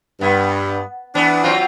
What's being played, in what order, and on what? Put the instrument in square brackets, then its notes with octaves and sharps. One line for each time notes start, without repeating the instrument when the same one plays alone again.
[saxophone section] G2 [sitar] B3
[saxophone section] E3 D4 [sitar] B3
[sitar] F#3 C4 F4